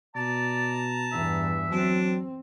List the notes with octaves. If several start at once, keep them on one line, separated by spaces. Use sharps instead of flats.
B2 D5 A5 A#5
E2 G2 E5
F#3 C4 D4